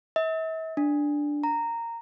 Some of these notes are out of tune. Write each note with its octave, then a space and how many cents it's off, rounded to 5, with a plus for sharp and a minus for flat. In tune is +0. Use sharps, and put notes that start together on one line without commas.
E5 -45
D4 +0
A#5 -10